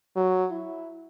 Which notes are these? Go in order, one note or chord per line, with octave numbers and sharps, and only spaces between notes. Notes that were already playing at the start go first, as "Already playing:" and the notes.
F#3
E4